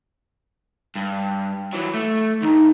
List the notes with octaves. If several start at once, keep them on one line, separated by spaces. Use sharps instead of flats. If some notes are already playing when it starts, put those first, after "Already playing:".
G2
E3 F#3
A3
E2 G2 D#4